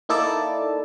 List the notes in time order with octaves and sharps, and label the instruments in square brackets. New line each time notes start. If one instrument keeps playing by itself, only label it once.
[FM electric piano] A#3 D#4 E4 A4 D5 A5